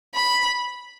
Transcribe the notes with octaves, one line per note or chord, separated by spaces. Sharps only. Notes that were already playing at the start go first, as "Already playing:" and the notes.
B5